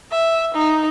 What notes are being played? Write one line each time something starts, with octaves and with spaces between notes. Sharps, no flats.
E5
D#4